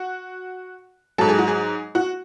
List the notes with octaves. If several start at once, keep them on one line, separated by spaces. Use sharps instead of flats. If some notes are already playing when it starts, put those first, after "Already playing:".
Already playing: F#4
G#2 F#3 A4
G#4
F#4
G#4
F#4